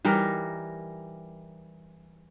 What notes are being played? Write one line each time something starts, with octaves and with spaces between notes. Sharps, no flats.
E3 G3 D#4 A#4